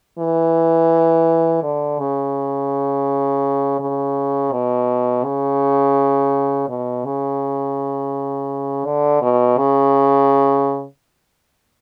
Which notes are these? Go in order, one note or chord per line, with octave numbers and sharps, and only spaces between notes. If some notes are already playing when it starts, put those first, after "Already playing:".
E3
D3
C#3
C#3
B2
C#3
B2
C#3
D3
B2
C#3